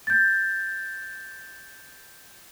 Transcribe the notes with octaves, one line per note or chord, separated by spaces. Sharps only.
G6 A6